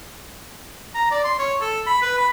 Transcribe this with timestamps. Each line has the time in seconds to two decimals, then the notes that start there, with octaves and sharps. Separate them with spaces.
0.95 A#5
1.11 D5
1.24 C6
1.39 C#5
1.61 A4
1.87 B5
2.02 B4
2.18 B5